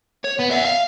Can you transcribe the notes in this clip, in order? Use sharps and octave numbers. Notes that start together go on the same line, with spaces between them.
C#5
B3
E5 F#5
F5